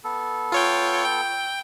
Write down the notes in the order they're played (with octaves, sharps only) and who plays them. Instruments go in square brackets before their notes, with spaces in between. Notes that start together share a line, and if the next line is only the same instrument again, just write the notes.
[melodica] B3 A4
[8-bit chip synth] F4 C#5 G5
G5